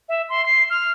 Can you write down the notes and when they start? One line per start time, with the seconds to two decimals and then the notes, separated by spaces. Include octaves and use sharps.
0.09 E5
0.29 C6
0.46 C7
0.70 F6